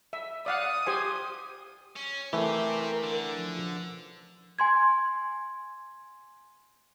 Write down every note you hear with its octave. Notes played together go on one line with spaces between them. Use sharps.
E5
D5 F5 F#5 D#6
G4 C5 G#5
C#4
E3 A3 C4 G4 A#4
D3
F3
G#5 C6 G#6